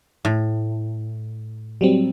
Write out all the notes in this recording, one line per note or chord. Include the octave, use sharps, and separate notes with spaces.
A2
F#3 G3 C4